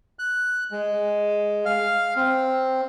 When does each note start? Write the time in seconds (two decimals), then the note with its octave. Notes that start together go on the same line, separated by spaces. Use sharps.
0.19 F#6
0.71 G#3
1.65 F5
2.16 C4